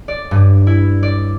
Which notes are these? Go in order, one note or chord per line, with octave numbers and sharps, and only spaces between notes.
D5
G2
E4
D5